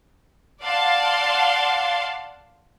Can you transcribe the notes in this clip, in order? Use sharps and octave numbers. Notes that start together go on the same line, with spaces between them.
D5 F5 F#5 A5 C6